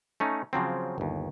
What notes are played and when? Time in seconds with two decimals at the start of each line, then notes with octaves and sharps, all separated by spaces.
0.20 A3 C#4 D#4
0.53 C#3 F3 F#3 C4
0.98 G1 D#2